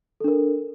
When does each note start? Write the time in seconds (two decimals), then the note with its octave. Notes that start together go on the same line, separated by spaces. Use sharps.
0.20 A4
0.24 D4
0.28 A#4